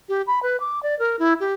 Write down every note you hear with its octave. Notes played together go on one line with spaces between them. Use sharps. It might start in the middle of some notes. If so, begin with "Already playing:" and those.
G4
B5
B4
D6
D5
A#4
E4
G4